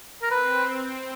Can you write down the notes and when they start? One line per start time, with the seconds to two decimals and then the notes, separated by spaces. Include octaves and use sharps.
0.22 A#4
0.31 C4 B4